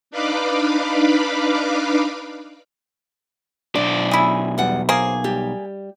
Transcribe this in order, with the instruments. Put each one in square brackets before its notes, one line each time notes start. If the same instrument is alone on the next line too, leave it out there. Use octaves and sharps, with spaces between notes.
[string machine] D4 D#4 B4 F5 B5 D6
[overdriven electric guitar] B1 D5 [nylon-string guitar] D4
[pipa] E4 G#4
[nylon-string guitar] E2 G3 F#5
[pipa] A#3 G#4 [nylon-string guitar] C5
[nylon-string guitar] G3 G4